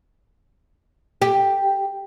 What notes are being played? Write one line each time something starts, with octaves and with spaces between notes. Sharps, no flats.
G4